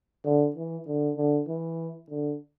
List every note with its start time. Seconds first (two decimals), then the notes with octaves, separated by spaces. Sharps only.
0.24 D3
0.56 E3
0.87 D3
1.17 D3
1.48 E3
2.10 D3